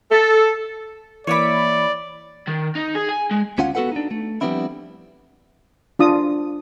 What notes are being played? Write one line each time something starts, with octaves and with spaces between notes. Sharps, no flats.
A4
E3 A#3 C#5 D5 E5 B5 D6
D#3
D#4
G#4
G#5
G#3
D2 C#4 F4 F5 F#5
B3 F#4 G#4 A4 B4 F#5
D4 D#4
A3
F3 G3 B3 C4 D4 E4
D4 F4 D#6